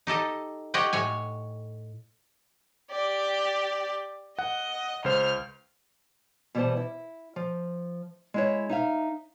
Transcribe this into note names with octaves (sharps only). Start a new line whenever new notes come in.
D#4 G4 A4 D#5
G4 C#5 D#5 F#5 G5
A2 C#5 G#5
G4 D5
D#5 F#5
C#2 C5 F6
B2 E3 G3 B3 C5 A5
E4
F3
G#3 E4 C#5
D#4 E5 F5